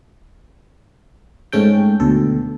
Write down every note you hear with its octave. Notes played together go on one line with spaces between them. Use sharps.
G#2 A3 C#4 A4 G5
D2 B2 A4